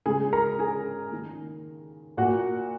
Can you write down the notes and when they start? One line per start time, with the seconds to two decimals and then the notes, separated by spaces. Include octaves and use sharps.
0.06 C#3 G#3 G#4 G#5
0.33 A#4 A#5
0.59 G#4 G#5
1.12 D#3 A#3
2.17 A#2 A#3 F#4 F#5